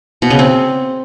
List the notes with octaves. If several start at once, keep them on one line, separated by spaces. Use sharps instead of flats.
B2
C#3
C4